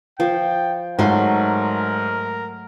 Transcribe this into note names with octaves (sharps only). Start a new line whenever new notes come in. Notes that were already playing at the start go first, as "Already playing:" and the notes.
F3 G5
G#2 F#3 A3 A#4 C6